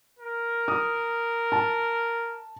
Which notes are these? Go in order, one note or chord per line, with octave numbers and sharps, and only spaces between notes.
A#4
D#6
A5